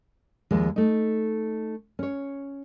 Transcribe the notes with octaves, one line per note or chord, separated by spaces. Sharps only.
D#2 F3 G#3
A3 D#4
C#4 C#5